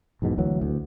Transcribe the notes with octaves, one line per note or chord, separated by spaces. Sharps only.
B1 E2 G#2 B2
D2 E3 F#3
D2